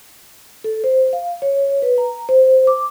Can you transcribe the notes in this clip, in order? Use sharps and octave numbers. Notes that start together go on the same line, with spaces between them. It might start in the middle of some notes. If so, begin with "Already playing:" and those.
A4
C5
F5
C#5
B4
A#5
C5
D6